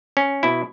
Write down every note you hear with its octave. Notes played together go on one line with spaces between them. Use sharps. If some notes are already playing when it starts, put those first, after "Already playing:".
C#4
B2 E4